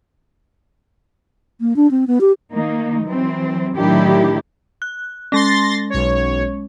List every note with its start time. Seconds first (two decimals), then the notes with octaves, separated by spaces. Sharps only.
1.61 A#3
1.76 D4
1.91 C4
2.07 B3
2.21 G4
2.51 D#3 A#3 D#4
3.03 E3 F#3 C4
3.76 A2 D#3 F#3 D4 E4 G4
4.82 F#6
5.32 G#3 C#4 C6 A6 A#6
5.90 B1 C#5